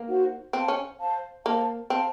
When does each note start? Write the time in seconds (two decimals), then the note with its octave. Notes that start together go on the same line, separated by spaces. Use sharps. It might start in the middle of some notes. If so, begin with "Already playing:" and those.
Already playing: A#3
0.08 D#4 F#4 C5 F#5
0.53 C4 C5 F5 A5
0.68 C#4
0.99 C5 F5 A5
1.45 A#3 C5 F5 A5
1.90 C4 C5 F5 A5